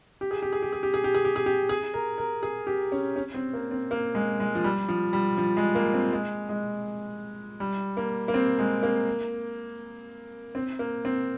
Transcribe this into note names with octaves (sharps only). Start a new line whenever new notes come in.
G4
G#4
G4
G#4
G4
G#4
G4
G#4
G4
G#4
G4
G#4
G4
G#4
A#4
A#4
G#4
G4
C#4
C#4
C4
A#3
C4
A#3
G#3
G#3
F3
G3
F3
G3
F3
G#3
A#3
C4
G#3
G#3
G3
A#3
A#3
C4
G#3
A#3
C4
A#3
C4